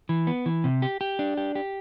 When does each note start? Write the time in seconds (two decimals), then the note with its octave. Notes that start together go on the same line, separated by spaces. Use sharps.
0.09 E3
0.27 B3
0.46 E3
0.64 C3
0.82 G4
1.01 G4
1.19 D4
1.37 G4
1.55 G4